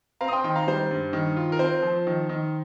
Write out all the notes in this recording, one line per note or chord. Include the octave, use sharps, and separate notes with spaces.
C4 F5 A#5
D#6
G5 C6
D#3 G5 C6
F5 A#5
G3 C5
G2
D#3
F4
A#4
C4 C5
F3
D#3
D#3